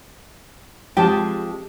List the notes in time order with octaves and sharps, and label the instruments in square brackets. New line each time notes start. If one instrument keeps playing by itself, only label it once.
[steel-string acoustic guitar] C3 F3 G#3 [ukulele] G4 G#4 A5